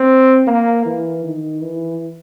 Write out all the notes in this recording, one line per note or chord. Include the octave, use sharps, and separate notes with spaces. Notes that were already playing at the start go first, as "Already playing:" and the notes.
Already playing: C4
A#3
E3
D#3
E3